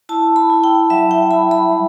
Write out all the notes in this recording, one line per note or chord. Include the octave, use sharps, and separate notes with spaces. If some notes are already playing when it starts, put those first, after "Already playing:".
E4 A5
B5
E4
G5
F#3 E5
G5
E4 B5
B5
G3